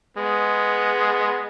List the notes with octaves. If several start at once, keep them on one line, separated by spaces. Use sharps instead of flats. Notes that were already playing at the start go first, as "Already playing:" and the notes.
G#3 B3